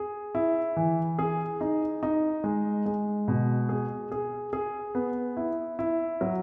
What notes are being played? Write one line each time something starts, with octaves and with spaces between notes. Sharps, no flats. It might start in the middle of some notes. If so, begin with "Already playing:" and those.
Already playing: G#4
E4
E3
G#4
D#4
D#4
G#3
G#3
B2
G#4
G#4
G#4
B3
E4
E4
F#3